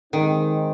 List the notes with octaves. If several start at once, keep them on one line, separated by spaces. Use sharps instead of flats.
G#2 D#3 G#3 C4 D#4